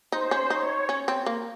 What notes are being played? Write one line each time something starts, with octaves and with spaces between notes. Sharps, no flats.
D#4 C5
C#4
D#4 C#5
C#4
C4
A#3